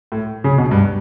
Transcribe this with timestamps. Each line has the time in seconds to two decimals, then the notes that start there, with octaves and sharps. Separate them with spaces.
0.12 A2
0.44 C#3
0.58 B2
0.71 G2